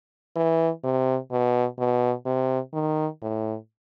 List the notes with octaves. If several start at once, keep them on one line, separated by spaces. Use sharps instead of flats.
E3
C3
B2
B2
C3
D#3
A2